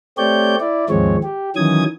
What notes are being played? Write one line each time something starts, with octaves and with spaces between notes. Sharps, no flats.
A3 C4 G4 C#5 D5 G6
E4 D5
D#2 G#2 F3 G#3 C4 C#5
G4
D#3 E3 F#3 C#4 D#6 G#6